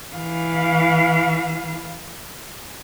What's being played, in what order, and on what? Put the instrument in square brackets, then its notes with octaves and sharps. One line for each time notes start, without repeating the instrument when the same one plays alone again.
[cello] E3 F5